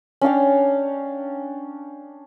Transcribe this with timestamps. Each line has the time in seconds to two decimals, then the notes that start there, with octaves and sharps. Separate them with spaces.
0.21 C#4 D4 F5 G5